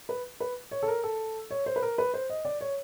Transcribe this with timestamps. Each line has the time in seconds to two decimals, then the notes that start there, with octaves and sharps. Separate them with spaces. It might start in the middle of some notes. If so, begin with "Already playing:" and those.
0.09 B4
0.40 B4
0.71 C#5
0.83 A4
0.88 A#4
1.04 A4
1.51 C#5
1.66 C5
1.76 B4
1.82 A#4
1.98 B4
2.14 C5
2.30 D#5
2.45 D5
2.61 C#5